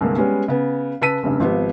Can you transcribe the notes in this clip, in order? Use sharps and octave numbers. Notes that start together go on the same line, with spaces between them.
C2 G2 D3 G#3 A#3
G3 G#3 B3 C#4
C#3 B3
C#3 B4 A5 E6 B6 D#7
F1 G2 C#3
G#1 F3 B3 G4